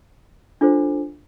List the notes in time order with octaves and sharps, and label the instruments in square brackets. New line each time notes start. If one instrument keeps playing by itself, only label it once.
[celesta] D4 F4 A4 C5